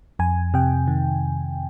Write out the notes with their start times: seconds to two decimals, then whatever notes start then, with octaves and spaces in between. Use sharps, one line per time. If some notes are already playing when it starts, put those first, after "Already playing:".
0.19 F2 G#5
0.54 C3 G5
0.88 D#3